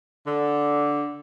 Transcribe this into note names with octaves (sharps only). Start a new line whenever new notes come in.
D3